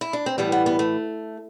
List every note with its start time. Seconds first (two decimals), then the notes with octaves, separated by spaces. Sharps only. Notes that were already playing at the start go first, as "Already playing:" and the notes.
0.01 E4
0.13 D4
0.26 C4
0.38 A2 E3 G3 B3
0.52 B3
0.66 B3
0.79 A3